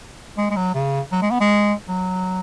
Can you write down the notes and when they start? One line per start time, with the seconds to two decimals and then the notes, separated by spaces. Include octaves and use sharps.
0.38 G#3
0.50 G#3
0.56 F#3
0.74 C#3
1.12 F#3
1.22 G#3
1.31 B3
1.40 G#3
1.88 F#3